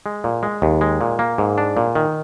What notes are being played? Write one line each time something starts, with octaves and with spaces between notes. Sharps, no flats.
G#3
A#2
G#3
D#2
G#3
A#2
A#3
G#2
D4
A#2
D#3